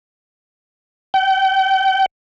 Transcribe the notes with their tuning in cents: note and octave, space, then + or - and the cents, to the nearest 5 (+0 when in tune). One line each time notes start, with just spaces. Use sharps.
G5 -35